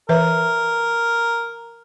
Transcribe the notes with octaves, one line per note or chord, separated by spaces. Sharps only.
E3 A#4 B4 E5